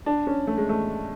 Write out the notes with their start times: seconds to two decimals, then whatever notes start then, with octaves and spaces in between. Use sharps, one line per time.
0.06 D4
0.27 C#4
0.47 A3
0.57 G#3
0.69 A3